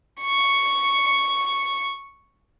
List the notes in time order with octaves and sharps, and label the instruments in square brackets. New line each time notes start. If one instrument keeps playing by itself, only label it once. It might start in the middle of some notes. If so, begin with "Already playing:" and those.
[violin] C#6 C#7